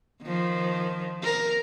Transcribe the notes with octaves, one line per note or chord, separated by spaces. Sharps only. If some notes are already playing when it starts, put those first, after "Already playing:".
D#3 F3
A#4